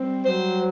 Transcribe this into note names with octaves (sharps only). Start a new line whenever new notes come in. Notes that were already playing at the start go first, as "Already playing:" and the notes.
Already playing: G3 C4
F#3 C5